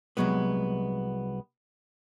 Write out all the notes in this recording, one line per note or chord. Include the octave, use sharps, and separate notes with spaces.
C2 F#2 F#3 G#3 B3